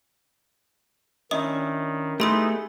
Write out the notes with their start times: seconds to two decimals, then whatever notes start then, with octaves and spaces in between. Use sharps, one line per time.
1.31 D#3 C#4 D4 E4 D#5 E5 D#6
2.20 A3 B3 D#4 E4 G4 G#4 C6 E6